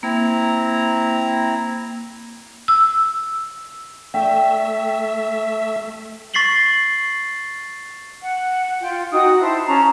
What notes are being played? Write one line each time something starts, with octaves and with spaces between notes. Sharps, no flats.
A#3 C4 E4 A#5
E6
A3 E5 G5
C#6 A6 B6 C7 F#7 G7
F#5
F4 G5
D#4 F#4 G5 D#6
E4 C5 A5
C#4 A5 A#5